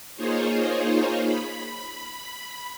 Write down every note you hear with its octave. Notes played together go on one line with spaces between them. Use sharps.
A#3 D#4 F4 G#4 C5 C#5
B5